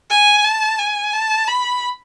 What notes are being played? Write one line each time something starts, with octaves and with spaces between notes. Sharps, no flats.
G#5
A5
G#5
A5
B5